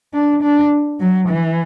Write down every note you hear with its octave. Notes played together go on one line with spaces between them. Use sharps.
D4
D4
F#3
E3